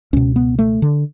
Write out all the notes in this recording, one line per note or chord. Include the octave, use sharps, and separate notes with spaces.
C#2 B2 C#4
B3
A3
D3